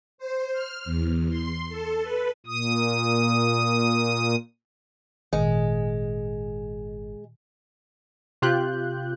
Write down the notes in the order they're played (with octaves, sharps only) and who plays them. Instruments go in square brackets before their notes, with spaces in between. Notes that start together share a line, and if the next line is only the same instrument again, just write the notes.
[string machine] C5
F6
E2
C6
A4
B4
[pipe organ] A#2 D#6
[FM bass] G#1 [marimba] A#2 D#3 [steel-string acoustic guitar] G#3
[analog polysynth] C3 F4 G4 F#6 G6